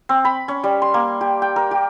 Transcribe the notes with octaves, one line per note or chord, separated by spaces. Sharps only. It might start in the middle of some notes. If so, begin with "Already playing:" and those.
C4
B5
C#4
G3
C6
A#3
G4
G5
A#4
G4